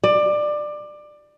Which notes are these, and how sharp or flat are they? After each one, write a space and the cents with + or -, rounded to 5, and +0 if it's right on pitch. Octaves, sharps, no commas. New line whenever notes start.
D5 +20